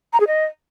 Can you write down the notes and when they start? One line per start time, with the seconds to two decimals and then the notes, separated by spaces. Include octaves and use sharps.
0.13 A#5
0.20 G#4
0.27 D#5